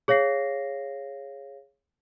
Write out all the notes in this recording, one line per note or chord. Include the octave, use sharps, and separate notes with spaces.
G#4 C#5 F5 A#6 C7